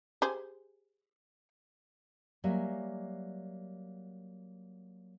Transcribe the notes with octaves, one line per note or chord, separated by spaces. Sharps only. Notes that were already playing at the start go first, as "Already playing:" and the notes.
G4 G#4 C5
F#3 G3 A#3 E5 G#5